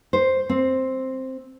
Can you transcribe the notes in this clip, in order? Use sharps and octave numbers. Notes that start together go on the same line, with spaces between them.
C5
C4